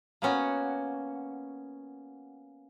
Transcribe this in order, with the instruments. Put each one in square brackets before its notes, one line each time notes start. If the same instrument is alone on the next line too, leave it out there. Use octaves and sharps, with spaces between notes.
[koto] A#3 B3 C#4 F#4